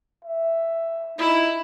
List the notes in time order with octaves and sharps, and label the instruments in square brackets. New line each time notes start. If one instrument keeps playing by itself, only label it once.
[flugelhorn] E5
[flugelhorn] D#4 [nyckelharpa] E4